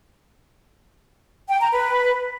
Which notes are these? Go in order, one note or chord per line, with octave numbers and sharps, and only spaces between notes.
G5
A#5
B4